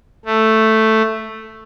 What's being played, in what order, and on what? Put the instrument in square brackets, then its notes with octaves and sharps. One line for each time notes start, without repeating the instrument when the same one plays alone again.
[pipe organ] A3